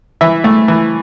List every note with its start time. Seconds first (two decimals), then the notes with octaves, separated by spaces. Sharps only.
0.21 E3 E5
0.44 A3
0.68 E3